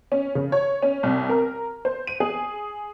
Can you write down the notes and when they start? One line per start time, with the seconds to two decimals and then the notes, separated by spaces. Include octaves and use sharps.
0.12 C#4
0.35 C#3
0.52 C#5
0.82 C#4
1.03 C2
1.29 A#4
1.85 C5
2.07 D#7
2.20 G#4